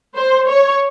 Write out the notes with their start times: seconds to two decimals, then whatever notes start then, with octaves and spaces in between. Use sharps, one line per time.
0.16 C5
0.48 C#5